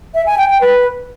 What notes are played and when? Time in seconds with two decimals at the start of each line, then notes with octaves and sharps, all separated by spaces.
0.14 E5
0.26 G#5
0.38 G5
0.50 G5
0.61 B4